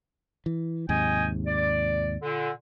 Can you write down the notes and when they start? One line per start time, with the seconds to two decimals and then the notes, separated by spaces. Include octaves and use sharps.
0.46 E3
0.89 D#2 G#2 C3 D#5 G5 G#5
1.46 D5
2.22 A#2 D3